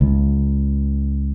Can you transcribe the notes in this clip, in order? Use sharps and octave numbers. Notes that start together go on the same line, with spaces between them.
C#2